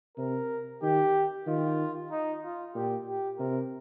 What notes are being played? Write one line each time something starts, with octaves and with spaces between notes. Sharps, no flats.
C3 A#4
D#3 G4
D#3 F4
D#4
F4
A#2 G4
G4
C3 A#4